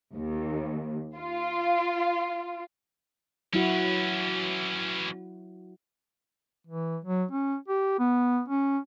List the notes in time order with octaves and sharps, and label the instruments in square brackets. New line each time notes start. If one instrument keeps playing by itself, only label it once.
[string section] D#2
F4
[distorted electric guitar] E3 C#4 [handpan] F#3 E4 F#4
[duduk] E3
F#3
C#4
G4
B3
C#4